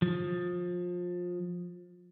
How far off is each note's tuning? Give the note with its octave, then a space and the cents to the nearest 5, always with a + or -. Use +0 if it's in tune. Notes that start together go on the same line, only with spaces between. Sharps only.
F3 +25